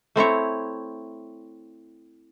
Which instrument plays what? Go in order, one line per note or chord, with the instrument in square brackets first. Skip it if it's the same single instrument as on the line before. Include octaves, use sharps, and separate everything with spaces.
[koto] A3 C4 E4 C#5